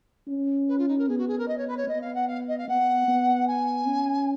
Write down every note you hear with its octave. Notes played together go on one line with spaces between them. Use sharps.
C#4
B4
F4
D#4
A#4
B3 G#4
F#4
G#4
A#4
D#5
C#5
B4
C#5
B3 D#5
F5
F#5
F5
D#5
F5
B3 F#5
B3
G#5
C#4